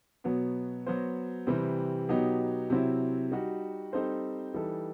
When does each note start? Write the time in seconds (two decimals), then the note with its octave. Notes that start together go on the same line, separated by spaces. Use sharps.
0.24 B2 F#3 B3
0.87 F#3 B3 F#4 C5
1.47 C3 E3 G3 C4
2.09 B2 F#3 B3 D#4 G4
2.70 C3 F#3 C4 E4
3.32 G3 D#4 F#4
3.93 G3 C4 D#4 A4 C5
4.54 E3 G3 D#4 A4